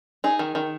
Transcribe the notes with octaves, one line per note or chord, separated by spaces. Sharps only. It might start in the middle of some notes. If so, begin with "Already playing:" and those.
D#4 G#4
D#3
D#3